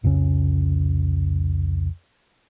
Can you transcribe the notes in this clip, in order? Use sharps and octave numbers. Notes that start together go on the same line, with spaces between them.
C2 F2 C#3 C#4